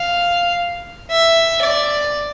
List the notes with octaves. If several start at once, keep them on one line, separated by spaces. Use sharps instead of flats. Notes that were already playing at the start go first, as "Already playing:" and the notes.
Already playing: F5
E5
D5